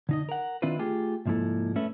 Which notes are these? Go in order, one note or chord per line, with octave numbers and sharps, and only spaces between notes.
D3 D#4 D#5
A#4 F#5
D#3 C4 D4 E4 F4 B4
A3 F4 G4 G#4
C2 G#2 F3 A#3 E4 A4
A3 C#4 A4 B4 E5